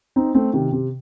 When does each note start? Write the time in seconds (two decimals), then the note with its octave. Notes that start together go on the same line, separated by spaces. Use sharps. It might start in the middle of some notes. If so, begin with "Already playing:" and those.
0.16 C4 D#4
0.35 A3 C4
0.53 C3 D#3
0.72 C3